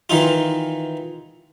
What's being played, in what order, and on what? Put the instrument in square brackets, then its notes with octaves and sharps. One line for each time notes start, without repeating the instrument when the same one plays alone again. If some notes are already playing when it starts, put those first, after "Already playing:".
[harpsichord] D#3 E3 D#4 F4